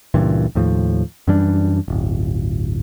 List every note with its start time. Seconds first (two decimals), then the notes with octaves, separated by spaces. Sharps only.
0.14 C#2 G2 A#2 E3
0.55 D#2 A2 F3
1.27 F#2 E3 G3 D4
1.88 D1 G1